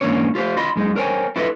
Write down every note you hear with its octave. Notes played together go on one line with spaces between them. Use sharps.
G#2 E3 A#3 C#4 D4 C#5
F4 G4 C5 F5
F4 D#5 B5 C6
F#2 G#3 D#4
A#4 C5 C#5 G5 G#5
E4 F4 A4 B4 D#5 E5